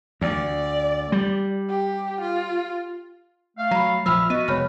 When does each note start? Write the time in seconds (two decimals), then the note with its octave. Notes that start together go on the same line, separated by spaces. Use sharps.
0.21 D2 D5
1.12 G3
1.69 G4
2.21 F4
3.57 A3 F5
3.71 F#3 A#5 B5
4.06 A#1 F3 E5 B5 E6 F6
4.30 B3 F#4 B4 D#5 D#7
4.48 F1 G#3 C#5 B5 F6